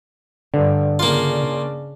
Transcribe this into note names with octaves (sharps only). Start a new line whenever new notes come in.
G2 D3
C#3 A#3 D4 F4